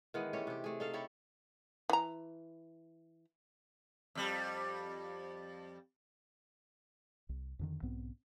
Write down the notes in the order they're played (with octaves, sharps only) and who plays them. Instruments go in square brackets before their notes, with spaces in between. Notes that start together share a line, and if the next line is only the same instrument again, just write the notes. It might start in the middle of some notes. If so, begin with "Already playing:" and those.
[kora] D#3 E3 G#3 B3
A3 C#4 G4 C#5
C3 G4
A3 G#4
D#4 A4 F5
E4 G4 A4 C#5
[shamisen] E3 A#5
[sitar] F2 G3
[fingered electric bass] C2
F2 D3 D#3
B1 G#2 B3 C4